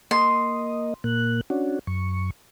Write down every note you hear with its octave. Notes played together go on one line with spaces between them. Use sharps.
A#3 D#5 C6
A#2 A#3 F#6
C#4 D4 F#4
F#2 C#6